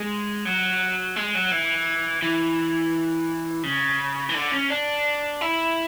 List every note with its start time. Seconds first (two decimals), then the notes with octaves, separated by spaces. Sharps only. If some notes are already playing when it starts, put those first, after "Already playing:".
Already playing: G#3
0.46 F#3
1.16 G#3
1.35 F#3
1.52 E3
2.22 E3
3.63 C#3
4.29 E3
4.34 D3
4.52 C#4
4.70 D4
5.41 E4